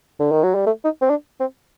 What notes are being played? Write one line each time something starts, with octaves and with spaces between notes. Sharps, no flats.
D3
D#3
F#3
G3
A3
D#4
C4
D4
C4